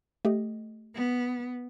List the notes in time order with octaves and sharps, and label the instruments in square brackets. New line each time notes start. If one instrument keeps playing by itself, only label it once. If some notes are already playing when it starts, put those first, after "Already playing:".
[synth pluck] A3 G4 D#5
[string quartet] B3